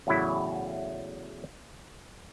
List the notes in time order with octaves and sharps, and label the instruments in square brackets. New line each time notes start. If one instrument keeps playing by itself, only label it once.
[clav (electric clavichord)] E2 A2 C#3 F#3 E4